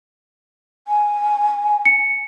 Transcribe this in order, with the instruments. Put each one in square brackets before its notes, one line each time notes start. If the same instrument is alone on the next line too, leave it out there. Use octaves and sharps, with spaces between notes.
[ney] G#5
[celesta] C#7